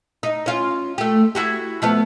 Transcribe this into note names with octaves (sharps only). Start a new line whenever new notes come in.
D#4
C#4 F4
A3 G4
E4 F#4 G4
F3 A3 B3